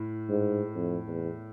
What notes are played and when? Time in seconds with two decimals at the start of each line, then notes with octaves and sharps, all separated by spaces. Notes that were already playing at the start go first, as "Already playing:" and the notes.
Already playing: A2
0.29 G#2
0.76 F2
1.08 E2